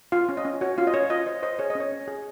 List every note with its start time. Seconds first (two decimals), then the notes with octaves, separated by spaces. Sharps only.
0.12 F4 F5
0.29 C#4
0.37 D#5
0.45 C#4
0.61 F#4 C#5
0.78 C#4 F4 F5
0.87 D#5
0.94 C#4 C#5
1.10 F4 D#5
1.26 C5 D#5
1.43 C5 D#5
1.59 G#4 C#5
1.70 D#5
1.75 C#4
1.80 C#5
1.92 C#4
2.08 G#4